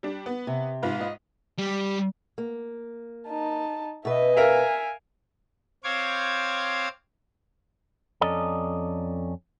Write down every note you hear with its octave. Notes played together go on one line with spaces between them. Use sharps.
G3 D4
B3
C3
G#2 F4 B4
D#5
G3
A#3
D#4 A5
B2 B4 D#5 E5
A#4 E5 F5 G#5
C4 C5 C#5 F5 D6 G#6
F2 C#4 A4 D5 D#5 A#5